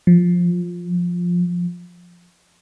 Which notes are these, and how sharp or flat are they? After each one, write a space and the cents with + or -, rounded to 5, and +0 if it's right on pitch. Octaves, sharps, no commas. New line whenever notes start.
F3 +10